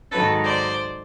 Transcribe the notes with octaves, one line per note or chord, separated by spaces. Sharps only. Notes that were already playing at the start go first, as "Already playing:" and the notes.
G#2 D#3 F#3 A4 B4
C5 D5